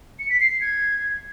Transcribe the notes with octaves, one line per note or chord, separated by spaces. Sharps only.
C#7
B6
C7
C7
G#6